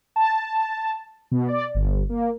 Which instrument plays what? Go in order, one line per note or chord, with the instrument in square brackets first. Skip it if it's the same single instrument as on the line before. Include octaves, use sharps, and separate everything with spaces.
[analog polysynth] A5
B2
D5
G1
A#3